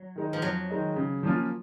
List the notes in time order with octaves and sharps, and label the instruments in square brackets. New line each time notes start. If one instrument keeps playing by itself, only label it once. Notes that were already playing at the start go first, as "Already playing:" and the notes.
Already playing: [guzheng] F#3
[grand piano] D#3 G#3 D#4
[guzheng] F3
[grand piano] F2 [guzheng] F#3
[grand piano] D#3 G#3 D#4
C#3
F3 A#3 C#4 F4